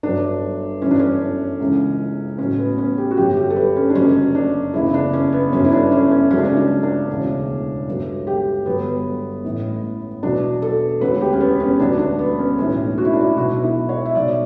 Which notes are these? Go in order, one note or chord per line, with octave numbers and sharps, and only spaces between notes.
G1 G2 F#3 D4
G1 F#2 E3 C#4
D4
C#4
C#2 C#3 E3
A1 A2 F#3 C#4
B3
C#4
G4
F#4
G1 F#2 D3 F#3 G4
G4
A4
B4
C#4
D4
F#1 F#2 D3 F#3 C#4
D4
F#1 E2 C#3 E3 E4
D4
C#4
B3
G1 G2 F#3 C#4
E4
D4
C#4
C#4
C#2 C#3 F#3 C#4
D4
C#4
D4
D4
E1 D2 C#3 E3
G1 G2 F#3
G4
G1 G2 D3 F#3 B3
A1 A2 E3
E2 B2 F#3 D4
A4
E1 D2 D3 B4
G4
C#4
B3
C#4
D2 D3 F#3 D4
D4
B3
C#4
B1 A2 E3 C#4
F#4
E4
D4
E4
B1 B2 F#3 F#4
E4
C#5
E5
B1 B2 F#3 D5